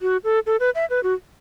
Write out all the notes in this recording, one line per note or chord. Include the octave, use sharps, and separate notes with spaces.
F#4
A4
A4
B4
E5
B4
F#4